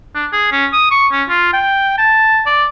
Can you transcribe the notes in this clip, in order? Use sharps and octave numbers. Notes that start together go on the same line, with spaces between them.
D4
G#4
C#4
D#6
C#6
C#4
F4
G5
A5
D5